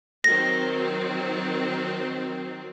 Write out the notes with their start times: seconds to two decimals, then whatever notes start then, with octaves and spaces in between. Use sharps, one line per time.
0.24 D#3 F#3 C4 A#6